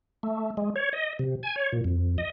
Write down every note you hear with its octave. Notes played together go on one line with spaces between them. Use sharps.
A3
G#3
C#5
D#5
C3
G#5
C#5
A#2
F2
D#5